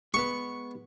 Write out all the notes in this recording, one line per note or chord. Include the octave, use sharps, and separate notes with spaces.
G#3 B3 B4 C#6